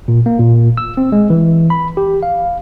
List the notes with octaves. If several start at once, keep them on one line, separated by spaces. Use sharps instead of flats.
A#2
A#3
A#2
E6
C4
G#3
E3
B5
G4
F5